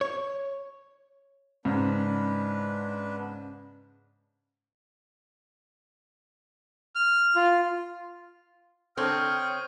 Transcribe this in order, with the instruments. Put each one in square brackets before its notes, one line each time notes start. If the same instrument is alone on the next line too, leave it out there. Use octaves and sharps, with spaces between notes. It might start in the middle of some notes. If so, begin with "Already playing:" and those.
[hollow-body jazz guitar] C#5
[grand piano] G#2 C#3 [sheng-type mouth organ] B3 D4 B4
[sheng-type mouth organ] F6
F4
[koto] D3 A#4 [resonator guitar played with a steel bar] C4 [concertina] C#5 [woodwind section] G5 D#6 F6